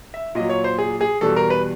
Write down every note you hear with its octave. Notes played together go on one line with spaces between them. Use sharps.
E5
A#2 F#3 D#5
C#5
C5
G#4
G#4
E2 B2 G3 A4
A#4
B4